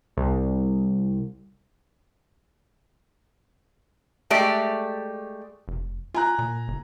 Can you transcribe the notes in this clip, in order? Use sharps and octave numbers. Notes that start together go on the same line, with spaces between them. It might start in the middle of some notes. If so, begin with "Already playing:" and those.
C2
G#3 A3 G4 D5 E5
F1
F4 G#5 A#5 F#6
A#2
G1